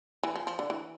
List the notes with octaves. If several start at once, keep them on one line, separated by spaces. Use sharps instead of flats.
E3
F3
F3
D3
E3